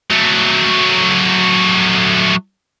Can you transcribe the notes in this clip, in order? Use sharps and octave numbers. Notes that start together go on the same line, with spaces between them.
F#3 A3